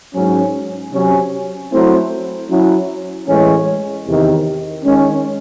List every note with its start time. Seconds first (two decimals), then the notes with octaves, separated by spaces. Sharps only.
0.15 G#2 F#3 C#4
0.93 C3 F#3 C#4
1.71 F#3 A3 C4 E4 C5
2.50 F#3 C#4 E4
3.28 A2 E3 G#3 C#4
4.06 E2 C3 D#3
4.85 D#3 G#3 C#4